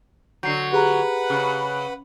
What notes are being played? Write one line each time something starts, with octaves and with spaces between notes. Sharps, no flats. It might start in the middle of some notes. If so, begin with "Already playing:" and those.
D3 F#3 G6 C7
G4 G#4 B4 F#5 A#5
C#3